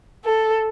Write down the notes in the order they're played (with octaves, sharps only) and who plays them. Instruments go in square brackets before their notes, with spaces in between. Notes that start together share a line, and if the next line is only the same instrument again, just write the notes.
[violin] A4